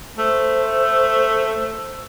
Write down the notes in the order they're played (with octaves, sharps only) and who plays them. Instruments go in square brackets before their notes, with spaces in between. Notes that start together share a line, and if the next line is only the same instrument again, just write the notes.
[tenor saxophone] A3 [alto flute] C5